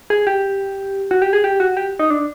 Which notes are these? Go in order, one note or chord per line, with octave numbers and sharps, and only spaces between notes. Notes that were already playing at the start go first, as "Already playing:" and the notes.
G#4
G4
F#4
G4
G#4
G4
F#4
G4
D#4
D4